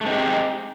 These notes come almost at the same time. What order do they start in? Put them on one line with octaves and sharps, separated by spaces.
A3 G#3 C4 D#4 G4